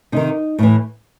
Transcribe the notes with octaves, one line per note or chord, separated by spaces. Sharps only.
C3 D#3 D#4
A2 E3